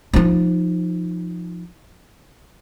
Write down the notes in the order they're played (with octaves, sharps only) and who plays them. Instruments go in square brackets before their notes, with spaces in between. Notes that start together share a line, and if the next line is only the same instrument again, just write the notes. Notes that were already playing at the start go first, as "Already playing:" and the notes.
[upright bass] F3 D#4